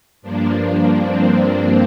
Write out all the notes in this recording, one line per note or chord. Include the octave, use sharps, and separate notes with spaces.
G2 F3 A#3 D4
C4